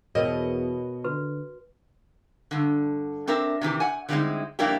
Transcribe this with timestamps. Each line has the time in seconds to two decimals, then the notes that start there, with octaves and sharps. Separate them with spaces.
0.15 E2 B2 A#4 B4 C#5 D#5
1.04 D3 F#4 B4
2.51 G2 D3
3.27 C4 D4 A#4 E5
3.61 C3 D#3 E3 G4
3.80 F#5 G#5
4.09 D3 G3 G#3 C4 D#4 E4
4.59 F2 G3 A#3 D4 E4 G4